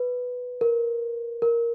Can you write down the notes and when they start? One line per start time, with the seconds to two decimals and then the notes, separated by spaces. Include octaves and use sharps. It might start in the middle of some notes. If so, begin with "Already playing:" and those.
Already playing: B4
0.61 A#4
1.42 A#4